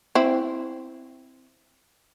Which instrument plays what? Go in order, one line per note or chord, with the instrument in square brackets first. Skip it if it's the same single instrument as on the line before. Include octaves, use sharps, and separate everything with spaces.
[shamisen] C4 E4